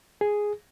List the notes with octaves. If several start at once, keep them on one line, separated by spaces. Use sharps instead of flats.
G#4